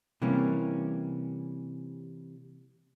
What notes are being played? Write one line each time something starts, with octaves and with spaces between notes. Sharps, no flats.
C3 E3 G3 A#3 C#4